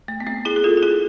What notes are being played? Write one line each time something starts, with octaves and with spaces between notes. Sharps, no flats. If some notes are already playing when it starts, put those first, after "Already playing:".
A3
B3
A3 C4
E4 G#4
G#4
F4 A4
F4
E4 G#4